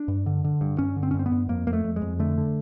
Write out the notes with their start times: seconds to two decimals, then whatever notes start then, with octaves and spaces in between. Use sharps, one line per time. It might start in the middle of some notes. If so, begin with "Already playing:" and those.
Already playing: D4
0.08 G2
0.26 D3
0.44 D3
0.61 G2
0.78 G2 C#4
0.96 D3
1.03 C4
1.11 C#4
1.14 G2
1.19 C4
1.26 B3
1.32 G2
1.49 F2 A#3
1.67 F2 A#3
1.73 A3
1.84 F2
1.96 G#3
2.02 F2
2.19 D3 A3
2.38 D3